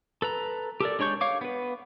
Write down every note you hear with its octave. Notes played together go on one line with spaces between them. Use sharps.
A4 B4 A#5
G4 A4 A#4 D5
G#3 D4 C#5 C#6 G6
C#5 F5 D6
B3 B4